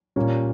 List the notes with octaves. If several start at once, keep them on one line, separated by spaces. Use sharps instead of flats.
A#2 G3 A#3 C#4